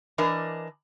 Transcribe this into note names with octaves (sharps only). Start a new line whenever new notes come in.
E3 D4 A#4 D#5